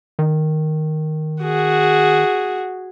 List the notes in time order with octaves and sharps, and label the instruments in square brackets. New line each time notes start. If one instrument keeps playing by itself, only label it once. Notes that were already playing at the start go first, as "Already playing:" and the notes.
[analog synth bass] D#3
[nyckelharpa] F#4 G#4